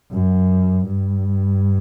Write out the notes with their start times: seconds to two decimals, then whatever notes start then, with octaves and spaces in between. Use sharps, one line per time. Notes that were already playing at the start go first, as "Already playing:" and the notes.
0.12 F#2
0.86 G2